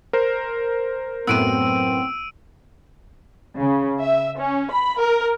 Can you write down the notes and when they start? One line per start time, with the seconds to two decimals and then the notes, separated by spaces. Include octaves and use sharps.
0.13 A#4 C5
1.27 F#2 A2 B3 C4 E6 D7 D#7
3.58 C#3
4.00 E5
4.39 C#4
4.71 B5
5.01 A#4